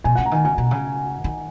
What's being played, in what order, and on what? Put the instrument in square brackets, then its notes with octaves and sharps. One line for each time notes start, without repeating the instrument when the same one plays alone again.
[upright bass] B2 [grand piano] G#5
[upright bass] C#3 [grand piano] F#5
[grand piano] A#5
[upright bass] D#3 [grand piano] G#5
[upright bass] C#3 [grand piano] G#5
[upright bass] B2
C#3
D#3